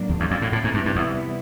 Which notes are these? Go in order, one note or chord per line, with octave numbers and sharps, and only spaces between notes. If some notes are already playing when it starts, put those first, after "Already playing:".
Already playing: A2 F#3 A#3 D4
E2
E2
F2
A2
A2 C3 E3 G3 B3 E4
G#2
G2
G2
E2